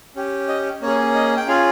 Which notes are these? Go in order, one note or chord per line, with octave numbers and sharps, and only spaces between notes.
C#4 G4
D#5
A#3 C#4 G#4 C#5
D#5
G5
C#4 F4 G#4 F5